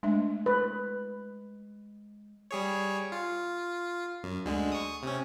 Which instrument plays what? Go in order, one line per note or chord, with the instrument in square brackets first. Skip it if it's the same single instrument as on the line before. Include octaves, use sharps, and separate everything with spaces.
[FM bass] G#3 [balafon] A3 D4 E5
[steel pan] B4
[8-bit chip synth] G3 G#4 C#5
F4
F#2
D2 D3 G#3
C#6 D#6
C3 C#4